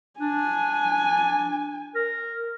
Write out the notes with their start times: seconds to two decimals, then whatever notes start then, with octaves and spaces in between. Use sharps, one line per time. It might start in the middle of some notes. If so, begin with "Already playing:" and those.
0.20 D4 G#5
1.95 A#4